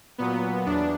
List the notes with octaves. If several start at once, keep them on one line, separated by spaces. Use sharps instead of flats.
A#2 F#3 B3
E2 D4